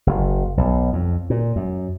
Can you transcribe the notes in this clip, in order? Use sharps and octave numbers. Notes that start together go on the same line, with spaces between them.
F#1
B1
F2
A#2
F#2